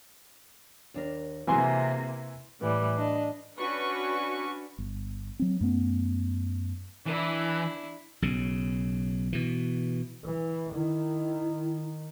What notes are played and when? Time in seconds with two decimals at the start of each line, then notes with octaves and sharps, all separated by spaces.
0.94 D#2 D4 A#4
1.47 C3 E3 A#3 C4 F#4 G#4 G#5 C6
2.60 A2 E3 G3
2.98 D4 D#5
3.57 C#4 D4 F#4 B4 C#6
4.78 G1
5.39 F#3 C4
5.61 F#2 A3 B3
7.06 E3 D4 E4
8.22 B1 C#3
9.33 B2 E3
10.24 E3
10.75 D#3 E4